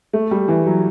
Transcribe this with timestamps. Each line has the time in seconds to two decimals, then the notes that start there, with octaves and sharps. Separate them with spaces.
0.13 A3
0.31 G3
0.48 E3
0.66 F#3